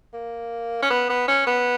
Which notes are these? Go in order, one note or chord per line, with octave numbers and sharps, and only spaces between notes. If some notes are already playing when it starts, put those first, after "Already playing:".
A#3
C#4
B3
B3
C#4
B3